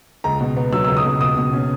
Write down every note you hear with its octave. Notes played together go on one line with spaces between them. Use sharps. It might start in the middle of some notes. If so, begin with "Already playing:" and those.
C#2 A#5
B2
B3
F#3 E6
C#2 E6
D#6
B2
C#2 D#6
B2
C#4